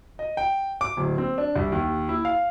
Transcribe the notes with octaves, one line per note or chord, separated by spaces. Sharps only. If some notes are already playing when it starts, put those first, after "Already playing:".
D#5
G5
D6
D1
C4
D4
C2
D#2
E4
F5